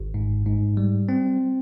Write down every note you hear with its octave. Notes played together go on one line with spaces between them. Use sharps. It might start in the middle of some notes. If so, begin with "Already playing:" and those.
Already playing: G#1
G#2
G#2
G3
C4